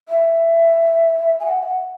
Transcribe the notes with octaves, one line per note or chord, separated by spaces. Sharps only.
E5
G#5
F#5
E5
F#5